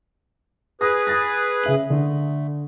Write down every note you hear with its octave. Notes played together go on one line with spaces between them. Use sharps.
G#4 B4 D#6 A#6
D#6 A6 A#6
C#3 E5 F#7
D3 A3